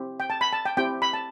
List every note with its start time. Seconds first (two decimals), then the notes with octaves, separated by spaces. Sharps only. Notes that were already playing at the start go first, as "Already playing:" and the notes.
Already playing: C4 E4 G4
0.20 G5
0.30 A5
0.41 B5
0.53 A5
0.65 G5
0.77 C4 E4 G4 G5
1.02 B5
1.13 A5